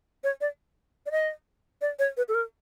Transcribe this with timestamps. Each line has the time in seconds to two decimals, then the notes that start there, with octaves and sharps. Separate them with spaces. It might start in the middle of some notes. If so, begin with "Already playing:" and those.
0.24 C#5
0.41 D5
1.06 D5
1.11 D#5
1.81 D5
1.99 C#5
2.17 B4
2.28 A4
2.35 A#4